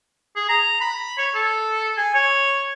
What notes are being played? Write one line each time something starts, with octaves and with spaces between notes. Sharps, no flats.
G#4
A#5
B5
C#5
A4
G#5
C#5